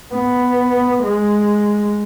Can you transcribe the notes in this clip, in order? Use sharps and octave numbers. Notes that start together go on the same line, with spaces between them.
B3
G#3